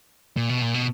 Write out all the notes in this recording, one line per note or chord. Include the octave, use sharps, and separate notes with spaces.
A#2
B2
A#2
B2